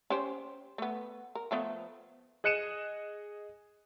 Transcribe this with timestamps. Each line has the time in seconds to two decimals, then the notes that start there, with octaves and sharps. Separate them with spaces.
0.10 C#4 G4 C5
0.78 A3 B3
1.35 A#4
1.51 F3 A3 B3
2.44 G#4 D#5 F#6 C#7 D#7 E7